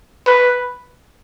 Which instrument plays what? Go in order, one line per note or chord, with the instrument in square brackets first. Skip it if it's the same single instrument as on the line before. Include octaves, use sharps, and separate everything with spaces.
[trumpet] B4